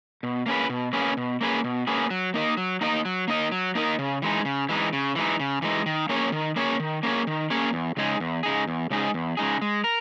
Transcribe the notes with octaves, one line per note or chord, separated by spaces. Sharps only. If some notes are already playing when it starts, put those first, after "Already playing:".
B2
A#3 C#4 G#4 B4
B2
A#3 C#4 G#4 B4
B2
A#3 C#4 G#4 B4
B2
A#3 C#4 G#4 B4
F#3
A#3 D#4 A#4 D#5
F#3
A#3 D#4 A#4 D#5
F#3
A#3 D#4 A#4 D#5
F#3
A#3 D#4 A#4 D#5
C#3
E3 G#3 D#4
C#3
E3 G#3 D#4
C#3
E3 G#3 D#4
C#3
E3 G#3 D#4
D#3
A#3 C#4 G#4 C#5
D#3
A#3 C#4 G#4 C#5
D#3
A#3 C#4 G#4 C#5
D#3
A#3 C#4 G#4 C#5
E2
C#3 G#3 D#4 G#4
E2
C#3 G#3 D#4 G#4
E2
C#3 G#3 D#4 G#4
E2
C#3 G#3 D#4 G#4
G#3
A#4